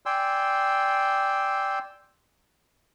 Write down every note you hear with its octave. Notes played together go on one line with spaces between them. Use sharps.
D5 G5 G#5 C6 E6